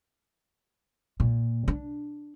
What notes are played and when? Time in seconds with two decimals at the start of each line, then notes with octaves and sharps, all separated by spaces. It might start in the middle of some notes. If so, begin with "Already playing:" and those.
1.20 A#2
1.68 D4